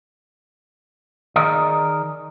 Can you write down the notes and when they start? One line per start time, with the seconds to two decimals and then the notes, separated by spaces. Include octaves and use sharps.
1.36 D#3 G#4 A#4 D5 D#5